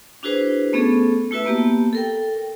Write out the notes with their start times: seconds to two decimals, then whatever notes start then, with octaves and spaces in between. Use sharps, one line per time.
0.23 D4 E4 F#4 G#4 B4 C5
0.73 A3 B3 C#4 G#4 A4
1.31 A3 E4 F#4 B4 E5 E6
1.45 A#3 B3 G4 A5
1.93 A4 A#4 G5